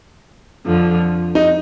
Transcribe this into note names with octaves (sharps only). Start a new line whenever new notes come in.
F2 D3 F3
D#4